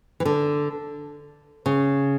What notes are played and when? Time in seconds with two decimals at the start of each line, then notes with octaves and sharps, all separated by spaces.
0.20 E3
0.25 D3
1.66 C#3